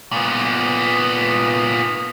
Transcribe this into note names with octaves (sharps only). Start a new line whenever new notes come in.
A#2 B3